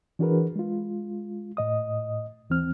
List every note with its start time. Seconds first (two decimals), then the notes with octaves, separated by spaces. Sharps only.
0.19 E3 D4 F#4 G#4 A#4 B4
0.56 G#3 F4
1.57 A2 D#5 D#6
2.50 D#2 E3 C4 F6